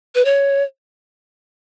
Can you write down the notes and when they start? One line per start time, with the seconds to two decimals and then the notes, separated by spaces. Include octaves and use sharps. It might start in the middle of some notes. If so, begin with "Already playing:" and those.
0.15 B4
0.25 C#5